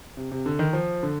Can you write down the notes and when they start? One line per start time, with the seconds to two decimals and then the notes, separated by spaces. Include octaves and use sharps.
0.17 C3
0.31 C3
0.46 D3
0.59 D#3
0.73 F3
1.03 D3